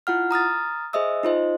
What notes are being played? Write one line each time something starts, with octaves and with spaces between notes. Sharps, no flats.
E4 F4 F#5 F6
A#5 D#6 F6 A6
G#4 C5 D#5 E5 D#6 E6
D#4 F4 C5 D#5